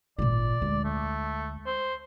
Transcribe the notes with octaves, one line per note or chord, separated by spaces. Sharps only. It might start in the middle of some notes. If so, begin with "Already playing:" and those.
G#1 A#2 F4 D5
D2 G#3
A3
C5